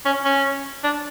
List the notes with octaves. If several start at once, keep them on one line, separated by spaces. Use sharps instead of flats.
C#4
C#4
D4